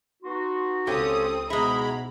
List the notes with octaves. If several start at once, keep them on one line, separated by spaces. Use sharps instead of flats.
B3 D#4 F#4 C6
C#2 C4 C#4 F4 G4 A4 D#6
G#2 B2 G#3 B3 E4 G#4 A#5 B5